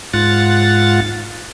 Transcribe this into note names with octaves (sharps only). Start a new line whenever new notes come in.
G#2 F4 F#5 A6